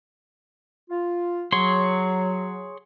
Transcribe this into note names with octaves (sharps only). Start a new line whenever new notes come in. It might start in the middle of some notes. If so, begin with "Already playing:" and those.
F4
F#3 G#4 C#5 C6